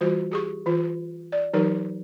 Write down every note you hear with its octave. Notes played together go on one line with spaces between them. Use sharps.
E3 G3 F4 F#4 C5
G4 G#4 C#6
E3 F4 C5
D5
E3 F#3 D#4 G4 A#4